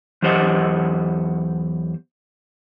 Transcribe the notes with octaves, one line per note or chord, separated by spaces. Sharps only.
E2 F#3 G4 C5 D#5 F#5